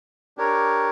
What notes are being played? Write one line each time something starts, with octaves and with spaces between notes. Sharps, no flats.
D4 G4 A#4 C#5